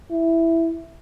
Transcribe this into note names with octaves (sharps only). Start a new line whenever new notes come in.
E4